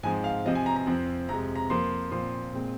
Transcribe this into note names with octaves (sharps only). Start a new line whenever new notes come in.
G#2 F3 G#3 C4 G#5
F5
C3 F3 C4 D#5
G#5
A#5
A#5
F2 F3 C4
F2 C3 G#3 A#5
A#5
F2 F3 A#3 C6
A#2 F3 C4 C6
A#2 G#3 C4